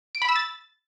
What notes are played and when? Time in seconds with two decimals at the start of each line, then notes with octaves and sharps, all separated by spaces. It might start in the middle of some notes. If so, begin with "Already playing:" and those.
0.15 D7
0.22 B5
0.29 E6
0.36 A6